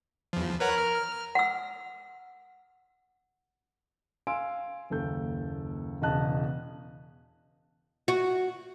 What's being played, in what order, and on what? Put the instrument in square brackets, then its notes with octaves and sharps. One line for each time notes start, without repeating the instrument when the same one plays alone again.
[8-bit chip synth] E2 F3
[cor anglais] A#4 [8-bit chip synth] B4 C#5 F#5
[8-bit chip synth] F6
[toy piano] F#5 E6
[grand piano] F5 G#5 C6 E6 D7
F#1 D#2 A4 G6
E1 E2 C#3 D#5 A5 F#6
[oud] F#4